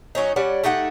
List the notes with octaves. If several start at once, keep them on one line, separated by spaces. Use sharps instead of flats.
F#3 C#4 D#4
G3 C#4 D5 F#5
A3 D#4 G4 F#5